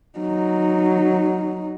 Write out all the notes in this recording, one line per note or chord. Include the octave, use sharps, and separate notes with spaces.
F#3 D#4